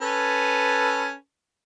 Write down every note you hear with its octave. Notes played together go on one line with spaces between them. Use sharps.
C#4 A4 B4